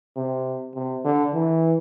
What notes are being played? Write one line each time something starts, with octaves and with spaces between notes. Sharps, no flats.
C3
C3
D3
E3